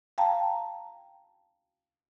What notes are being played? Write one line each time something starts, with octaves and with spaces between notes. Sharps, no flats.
F5 G5 A5 A#5